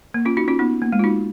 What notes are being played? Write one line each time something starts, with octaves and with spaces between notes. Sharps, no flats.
A#3
C#4 F4
D#4 F#4
C#4 F4
B3 D#4
A#3
G#3
F4
D#4 F#4